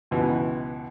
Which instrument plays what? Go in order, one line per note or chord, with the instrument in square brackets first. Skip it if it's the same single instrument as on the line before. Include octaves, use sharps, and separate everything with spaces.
[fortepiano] C#2 F#2 B2 E3